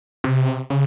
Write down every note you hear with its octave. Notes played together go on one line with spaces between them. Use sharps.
C3
C#3